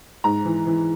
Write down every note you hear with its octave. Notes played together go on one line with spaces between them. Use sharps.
G#2 A#5
E3
E3